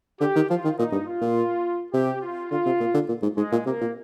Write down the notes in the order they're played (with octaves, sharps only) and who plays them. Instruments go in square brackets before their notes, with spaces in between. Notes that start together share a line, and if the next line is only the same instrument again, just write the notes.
[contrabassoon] D3 [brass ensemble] G4
[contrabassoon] D#3
[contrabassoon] F3 [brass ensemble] F4
[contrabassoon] D#3
[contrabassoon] A#2 [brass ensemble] D#4
[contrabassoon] G2
[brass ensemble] F4
[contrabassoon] A#2
[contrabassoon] C3 [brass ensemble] G4
[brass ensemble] F4
[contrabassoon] D3 [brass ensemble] F4
[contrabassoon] C3
A#2
D3
A#2
G#2
[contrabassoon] G#2 [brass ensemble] G#3
[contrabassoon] A#2
[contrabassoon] C3 [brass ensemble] A#3
[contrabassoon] A#2